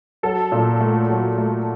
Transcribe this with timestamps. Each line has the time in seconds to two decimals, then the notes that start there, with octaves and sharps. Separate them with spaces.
0.23 F#3 A4
0.52 A#2
0.80 A3
1.09 F#3
1.38 A3